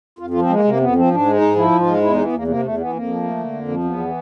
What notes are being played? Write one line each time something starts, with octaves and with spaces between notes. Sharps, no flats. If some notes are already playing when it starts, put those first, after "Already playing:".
F2 F4
F3 F4
C4
G#3 A#3
C3 A#3
F2 B3
F3 C4
G#2 D4
G#3
D#4
G#2
F3 E4
G#2
F4
G#3
E2 E4
E3 D#4
B3
E2 A#3
C3 A#3
E2 A3
E3 B3
F2 A#3
F3
A3
D3
F2
F3
E2 B3
E3